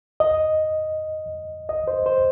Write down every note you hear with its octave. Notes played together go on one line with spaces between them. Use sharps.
D#5
D#5
C5
C5